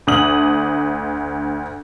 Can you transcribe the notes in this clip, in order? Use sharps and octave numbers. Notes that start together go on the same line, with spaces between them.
D2 D4 D#6 F#7